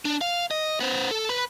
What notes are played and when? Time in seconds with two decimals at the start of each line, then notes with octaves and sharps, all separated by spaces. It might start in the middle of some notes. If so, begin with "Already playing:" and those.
0.05 D4
0.21 F5
0.51 D#5
0.80 B3 C5
1.11 A4
1.29 B4 B5